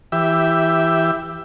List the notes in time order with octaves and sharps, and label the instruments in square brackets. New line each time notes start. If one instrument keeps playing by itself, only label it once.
[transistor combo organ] E3 G4 E5